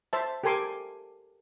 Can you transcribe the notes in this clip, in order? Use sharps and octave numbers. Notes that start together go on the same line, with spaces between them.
C5 E5 A5
G4 A4 A#4 G#5 C6 D6